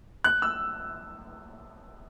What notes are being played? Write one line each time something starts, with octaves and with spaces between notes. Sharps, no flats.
F#6
E6